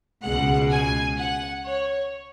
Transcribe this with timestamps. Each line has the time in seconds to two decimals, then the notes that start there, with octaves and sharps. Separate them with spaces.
0.23 C#2 B2 G#3 F#5
0.70 G#5
1.17 F#5
1.66 C#5